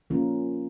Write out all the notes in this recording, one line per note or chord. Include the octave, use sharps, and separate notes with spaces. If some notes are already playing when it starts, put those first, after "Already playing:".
F3 A#3 C#4 F4 A#4